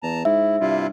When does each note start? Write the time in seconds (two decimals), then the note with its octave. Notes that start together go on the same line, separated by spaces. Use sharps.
0.03 E2 A5 A#5
0.25 G#2 E4 E5
0.60 G2 C3 E4 F4